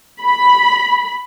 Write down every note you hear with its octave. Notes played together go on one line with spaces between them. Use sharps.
B5